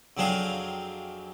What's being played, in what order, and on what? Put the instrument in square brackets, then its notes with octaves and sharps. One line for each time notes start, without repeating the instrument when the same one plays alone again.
[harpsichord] F2 F#3 C4 D4 G#4 F5